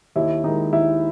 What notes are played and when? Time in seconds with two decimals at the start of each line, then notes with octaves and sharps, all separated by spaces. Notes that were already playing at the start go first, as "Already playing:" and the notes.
0.16 D#2 E4
0.44 D#3 G#3 D#4
0.72 D#2 E4